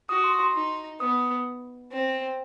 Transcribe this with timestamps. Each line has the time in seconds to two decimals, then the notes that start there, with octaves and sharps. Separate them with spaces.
0.09 F#4 D#6
0.24 C6
0.39 C6
0.54 D#4
1.00 B3 D#6
1.92 C4